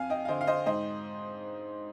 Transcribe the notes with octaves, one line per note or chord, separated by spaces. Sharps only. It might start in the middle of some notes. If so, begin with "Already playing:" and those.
Already playing: F2 F5 G#5
D#5 G5
F5
D3 C5 D#5
F5
C5 D#5
G#2 C5 D#5